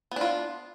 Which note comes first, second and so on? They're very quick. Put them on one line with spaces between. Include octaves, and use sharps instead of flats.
B3 D4 F4